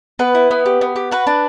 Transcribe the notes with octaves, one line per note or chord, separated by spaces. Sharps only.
B3 B4
E4
B3
G4
B3
G4
F#4 B4
D4